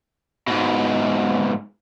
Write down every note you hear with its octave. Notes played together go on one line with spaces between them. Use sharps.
G#2 B2